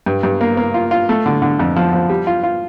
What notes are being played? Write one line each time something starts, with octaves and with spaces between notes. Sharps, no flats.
G2
G2
A#3
A#3
F4
F4
A3
D3
D3
F2
F3
F3
G3
F4
F4